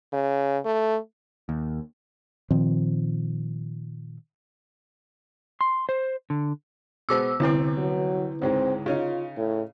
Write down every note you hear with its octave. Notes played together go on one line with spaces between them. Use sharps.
C#3
A3
D#2
A#2 D#3 F3 C4
C6
C5
D3
B2 G#3 B3 C5 D6 E6
C2 D3 C4 E4 B4
F#3
C#2 G#2 G#3 C4
C#3 C#4 D#4 F4
A2